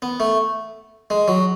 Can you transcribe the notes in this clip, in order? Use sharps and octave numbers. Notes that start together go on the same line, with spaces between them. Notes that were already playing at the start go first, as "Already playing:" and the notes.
B3
A3
G#3
F#3